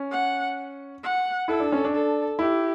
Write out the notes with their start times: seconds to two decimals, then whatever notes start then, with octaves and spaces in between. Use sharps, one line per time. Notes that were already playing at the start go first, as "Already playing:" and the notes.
Already playing: C#4
0.12 F#5
1.03 F#5
1.48 E4 A4
1.60 D4
1.72 C#4
1.85 D4
1.93 A4
2.39 E4 G4